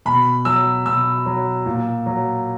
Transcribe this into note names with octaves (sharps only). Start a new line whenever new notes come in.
B2 B5
F#3 E6
B2 E6
F#3
A#2
F#3